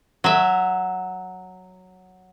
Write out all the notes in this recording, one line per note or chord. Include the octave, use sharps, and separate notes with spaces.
F#3 E5